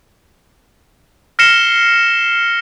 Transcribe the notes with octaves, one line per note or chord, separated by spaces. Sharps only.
F6 A#6 C7 C#7 E7 G7